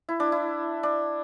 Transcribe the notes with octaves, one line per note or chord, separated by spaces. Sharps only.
E4
D4
E4
D4